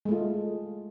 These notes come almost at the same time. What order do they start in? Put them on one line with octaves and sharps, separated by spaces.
G#3 A3 F4